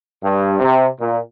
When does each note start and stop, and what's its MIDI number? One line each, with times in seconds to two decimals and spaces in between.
0.23 0.57 43
0.60 0.87 48
1.00 1.18 46